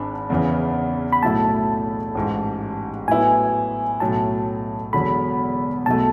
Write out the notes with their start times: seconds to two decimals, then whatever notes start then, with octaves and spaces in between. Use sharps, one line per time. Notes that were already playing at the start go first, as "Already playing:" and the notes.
Already playing: G#1 G#2 G#3 D4 B5
0.30 E2 C#3 E3
1.12 B5
1.23 B1 A2 F#3 A3 E4 A5
2.15 A1 G#2 G#3
3.08 A2 F#3 B3 E4 G#5
4.00 B1 A2 F#3 A5
4.93 E1 E2 D3 F#3 B5
5.86 B1 B2 A3 A5